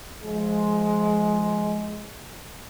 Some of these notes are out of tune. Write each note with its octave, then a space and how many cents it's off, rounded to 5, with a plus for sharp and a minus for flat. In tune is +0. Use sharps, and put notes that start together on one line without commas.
F3 -10 G#3 +15